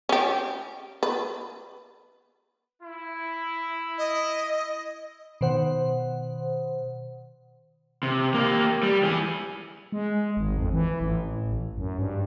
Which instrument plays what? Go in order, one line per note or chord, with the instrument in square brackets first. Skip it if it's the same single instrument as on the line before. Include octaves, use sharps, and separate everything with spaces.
[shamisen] C#4 G4
B4
[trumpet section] E4
[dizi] D#5
[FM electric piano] B2 D#3 C5 F#5
[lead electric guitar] C3
A#3 G4
G3
E3 G#4
[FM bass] G#3
G#1
F2
E3
A1
F#2
G2